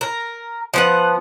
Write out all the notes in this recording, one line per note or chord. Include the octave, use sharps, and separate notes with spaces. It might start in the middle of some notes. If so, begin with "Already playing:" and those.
A#4
F3 B3 F#5